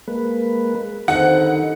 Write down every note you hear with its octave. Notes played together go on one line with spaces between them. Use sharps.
G#3 A#3 B4
D3 D#3 G3 C4 D#4 F#5